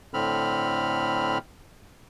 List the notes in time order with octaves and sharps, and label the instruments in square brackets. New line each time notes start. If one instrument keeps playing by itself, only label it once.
[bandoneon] A2 D3 C4 B5 F6